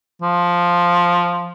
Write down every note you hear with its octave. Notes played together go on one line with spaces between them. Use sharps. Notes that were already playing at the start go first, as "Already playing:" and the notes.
F3